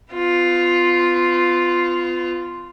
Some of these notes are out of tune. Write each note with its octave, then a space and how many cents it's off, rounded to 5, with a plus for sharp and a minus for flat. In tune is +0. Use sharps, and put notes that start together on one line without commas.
B3 +40 F4 +0